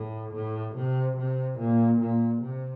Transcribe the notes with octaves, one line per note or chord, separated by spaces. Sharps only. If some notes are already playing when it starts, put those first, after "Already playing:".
Already playing: A2
A2
C3
C3
A#2
A#2
C3